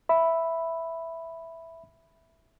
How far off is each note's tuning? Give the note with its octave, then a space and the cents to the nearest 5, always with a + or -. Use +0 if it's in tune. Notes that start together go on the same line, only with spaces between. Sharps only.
E5 +0 B5 +0